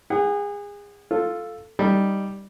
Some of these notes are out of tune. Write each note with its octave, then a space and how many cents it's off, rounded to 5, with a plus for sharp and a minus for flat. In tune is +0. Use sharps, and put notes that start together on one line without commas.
G#4 -30 F#5 +15
F4 +0 A4 +0
G3 +0 D#4 +0